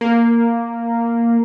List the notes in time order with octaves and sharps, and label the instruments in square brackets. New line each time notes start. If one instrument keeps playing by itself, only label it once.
[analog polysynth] A#3